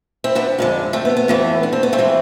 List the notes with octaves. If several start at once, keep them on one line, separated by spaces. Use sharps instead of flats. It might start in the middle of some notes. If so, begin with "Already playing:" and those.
C4 E4
B3 D4
F2 D3 G#3
A3 C4
B3
B3
F2 E3 A3
D4
C4
B3
A3 C4
E3 G#3